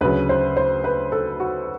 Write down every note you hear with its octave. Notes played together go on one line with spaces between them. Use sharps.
D2 C#3 F#3 B4
C5
C5
B4
A4
F#4